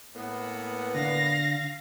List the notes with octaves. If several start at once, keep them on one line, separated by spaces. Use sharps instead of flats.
A2 A#3 B3
D3 F5 A#6